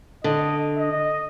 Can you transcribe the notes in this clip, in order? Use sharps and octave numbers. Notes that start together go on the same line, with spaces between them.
D3 D#5
D#5